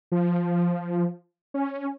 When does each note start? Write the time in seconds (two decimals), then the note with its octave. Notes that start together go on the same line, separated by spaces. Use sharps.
0.12 F3
1.54 C#4